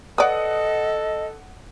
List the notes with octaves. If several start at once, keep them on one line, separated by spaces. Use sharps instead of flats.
A4 B4 D5 D#5 F#5 D#6